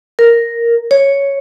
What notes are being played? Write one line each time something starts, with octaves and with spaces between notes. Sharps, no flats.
A#4
C#5